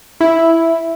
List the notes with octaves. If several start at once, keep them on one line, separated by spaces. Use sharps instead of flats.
E4